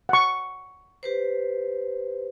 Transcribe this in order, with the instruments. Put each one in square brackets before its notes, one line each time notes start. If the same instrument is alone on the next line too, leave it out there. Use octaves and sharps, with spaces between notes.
[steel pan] F#5 C#6
[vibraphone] G4 B4 C5